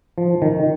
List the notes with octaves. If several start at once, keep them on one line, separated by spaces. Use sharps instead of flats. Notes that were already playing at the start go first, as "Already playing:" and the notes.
F3
D#3